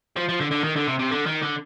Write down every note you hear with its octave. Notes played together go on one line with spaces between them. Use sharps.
F3
F3
D3
D3
D#3
D3
C3
C3
D3
D#3
D3